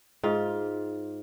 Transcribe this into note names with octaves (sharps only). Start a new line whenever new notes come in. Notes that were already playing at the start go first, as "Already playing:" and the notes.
G#2 F4